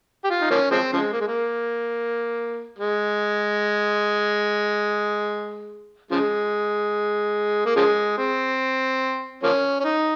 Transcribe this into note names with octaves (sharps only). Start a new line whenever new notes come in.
G4
F4
D#4
F3 A#3 C#4
F3 G#3 C4
C#3 F3 G#3
A#3
G#3
A#3
G#3
C#3 F3 G#3
A#3
C#3 F3 G#3
C4
F3 A#3 C#4
C#4
D#4